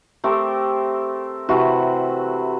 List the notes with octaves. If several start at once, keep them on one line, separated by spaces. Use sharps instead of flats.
A3 C4 G4 A#4
C3 E3 A3 F#4